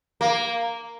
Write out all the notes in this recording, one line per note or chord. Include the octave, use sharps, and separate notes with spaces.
A#3